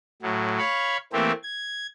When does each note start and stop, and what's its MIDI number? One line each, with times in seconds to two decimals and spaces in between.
0.22 0.59 45
0.22 0.59 54
0.59 0.97 73
0.59 0.97 77
0.59 0.97 83
0.59 0.97 85
1.13 1.32 52
1.13 1.32 57
1.13 1.32 58
1.13 1.32 60
1.13 1.32 67
1.43 1.87 92